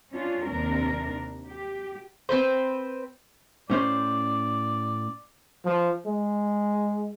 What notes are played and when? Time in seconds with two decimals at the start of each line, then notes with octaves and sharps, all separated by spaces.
0.11 C#4 D4 F4
0.47 D#2 C3 D4 A#4
1.48 G4
2.29 C4 B4 C5
3.70 A2 C#4 C5 D5
5.65 F3
6.06 G#3